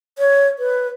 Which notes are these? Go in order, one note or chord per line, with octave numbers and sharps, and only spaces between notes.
C#5
B4